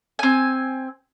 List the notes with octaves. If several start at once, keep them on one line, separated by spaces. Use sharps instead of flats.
C4 G#5